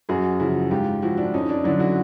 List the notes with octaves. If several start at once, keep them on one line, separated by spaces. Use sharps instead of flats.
F#2 F#4 G#4
C#3 F3 E4 F#4
G#2 F4 G4
F3 E4 F#4
D4 E4
F2 C#4 D#4
D4 E4
D3 F#3 D4 E4
E4 F#4